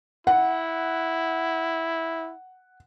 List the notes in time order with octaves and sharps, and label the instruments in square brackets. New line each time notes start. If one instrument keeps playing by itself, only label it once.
[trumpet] E4 [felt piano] F#5